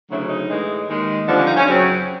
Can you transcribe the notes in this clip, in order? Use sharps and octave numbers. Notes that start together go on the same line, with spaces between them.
D2 C#3 F#3 E4
D#4
A2 E3 G#3
D#2 D#3 G#3
G2 D3 F3
C#4
D#4
C#4
F#2 C#3 F#3 C4